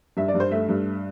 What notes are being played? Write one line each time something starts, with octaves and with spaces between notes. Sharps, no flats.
G2 E5
D5
G2
C5
A3 E5
G2